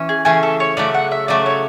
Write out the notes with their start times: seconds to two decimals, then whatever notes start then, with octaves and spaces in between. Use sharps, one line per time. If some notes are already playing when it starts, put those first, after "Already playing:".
Already playing: E3 C#4
0.09 G#4
0.25 C#3 E3 A3 C#4 G#4
0.43 A4
0.60 C#5
0.77 C#3 F#3 A3 D5
0.94 F#5
1.11 E5
1.28 C#3 F#3 A3 D5
1.46 C#5